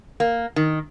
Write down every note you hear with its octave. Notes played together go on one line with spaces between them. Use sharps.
A#3
D#3